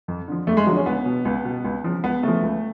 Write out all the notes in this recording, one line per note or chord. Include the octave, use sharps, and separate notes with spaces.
F2
D3 F3
F2 A3
G#3
D3 F3 F#3
C#4
C#2 B3
B2
C#2
B2
C#2
C#3 F3
C#2 B3
C#3 F3 A3
C#2